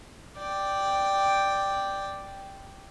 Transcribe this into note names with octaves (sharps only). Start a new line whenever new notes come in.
D5 G5